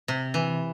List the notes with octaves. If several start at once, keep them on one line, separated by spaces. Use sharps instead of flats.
C3
E3